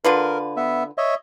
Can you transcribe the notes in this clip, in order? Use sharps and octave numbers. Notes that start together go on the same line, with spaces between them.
D3 F4 A#4 B4
B3 E5
C#5 D#5 E5